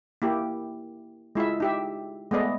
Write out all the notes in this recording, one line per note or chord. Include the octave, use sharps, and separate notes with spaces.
A#3 E4 G4
G#3 E4 F4 E5
D#4 G4 E5
G#3 A3 B3 D5 D#5